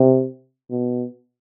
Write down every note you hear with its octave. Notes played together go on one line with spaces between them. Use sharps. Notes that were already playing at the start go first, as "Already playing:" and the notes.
Already playing: C3
B2